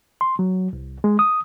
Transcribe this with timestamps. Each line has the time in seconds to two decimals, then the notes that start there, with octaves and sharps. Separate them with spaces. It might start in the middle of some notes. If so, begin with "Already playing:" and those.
0.21 C6
0.39 F#3
0.73 C2
1.04 G#3
1.19 D#6